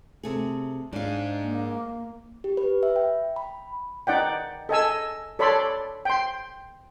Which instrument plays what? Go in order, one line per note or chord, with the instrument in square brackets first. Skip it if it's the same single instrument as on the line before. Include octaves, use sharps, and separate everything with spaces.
[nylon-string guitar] C3 A3 G#4
[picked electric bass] G#2 [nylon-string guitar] D4 F5
[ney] A#3
[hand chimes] G4
B4
E5
G5
B5
[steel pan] D#4 D5 F#5 G5
A4 D#5 G#5 E6
A4 C#5 D5 B5 C6 D6
G5 C6